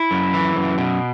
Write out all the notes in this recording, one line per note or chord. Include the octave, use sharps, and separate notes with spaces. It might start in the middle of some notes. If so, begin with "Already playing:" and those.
Already playing: E4
F#2
E3
F#2
B2